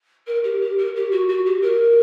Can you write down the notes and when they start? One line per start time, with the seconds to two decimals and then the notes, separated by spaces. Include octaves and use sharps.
0.26 A#4
0.43 G4
0.60 G4
0.78 A#4
0.95 G4
1.11 F#4
1.28 F#4
1.45 G4
1.62 A#4